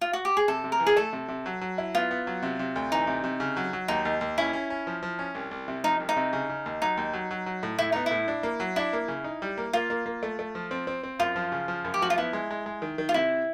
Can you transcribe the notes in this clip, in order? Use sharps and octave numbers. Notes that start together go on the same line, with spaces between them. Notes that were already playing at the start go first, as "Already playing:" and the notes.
F4
F#4
G4
G#4
C3 A4
C3
A#4
E3
G#4
A3 A4
C3
C3
F#3
F#3
E4
B3 F4
B3
F#3
C3
C3
D2
E3 D#4
C3
C3
C#3
F#3
F#3
D#2 D#4
D#2
D#2
C#4 E4
C#4
C#4
F3
F3
C#4
C2
C2
C3
F3 D#4
C2
D#4
C3
C#3
C#3
D#2
F#3 D#4
D#2
F#3
F#3
F#3
A2
A2 E4
B3 D#4
A2 E4
D4
A#3
F#3
D4 E4
A#3
C#3
D#4
G3
A#3
A#3 F4
A#3
A#3
A3
A3
F3
C4
C4
C4
F#2 F4
F3
C#3
F3
F#2
G4
F3 F#4
F4
B3 E4
G#3
G#3
G#3
D#3
D#3
F4
C3 E4